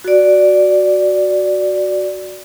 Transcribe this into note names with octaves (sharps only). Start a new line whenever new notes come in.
F#4 D5